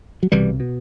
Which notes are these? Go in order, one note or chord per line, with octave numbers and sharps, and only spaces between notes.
F#3
C2 B2 E3 G3
B2